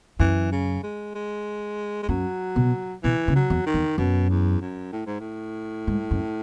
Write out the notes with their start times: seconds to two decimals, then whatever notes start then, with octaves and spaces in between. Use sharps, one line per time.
0.19 F#2 E3
0.52 C#3
0.83 G#3
1.15 G#3
2.03 G#3
2.09 F#2 F#3
2.56 B2
3.03 B2 E3
3.28 C#3
3.35 F#3
3.50 E2
3.66 D#3
3.74 E2
3.98 F#2 B2
4.30 E2
4.61 F#2
4.92 A2
5.06 G#2
5.20 A2
5.87 G#2
6.11 F#2